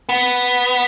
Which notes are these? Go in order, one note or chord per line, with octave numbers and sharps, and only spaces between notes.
B3